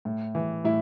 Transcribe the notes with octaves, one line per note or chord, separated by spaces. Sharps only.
A2
E3
A2 E4